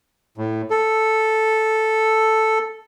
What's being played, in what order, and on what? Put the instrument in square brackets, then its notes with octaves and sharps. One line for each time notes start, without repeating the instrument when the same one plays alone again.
[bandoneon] A2
A4